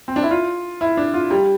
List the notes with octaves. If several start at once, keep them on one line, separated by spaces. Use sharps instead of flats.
C4
D4
E4
F4
E4
D4
F4
G3